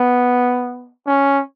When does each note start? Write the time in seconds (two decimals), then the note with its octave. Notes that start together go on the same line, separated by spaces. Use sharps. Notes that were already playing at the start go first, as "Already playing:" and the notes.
Already playing: B3
1.07 C#4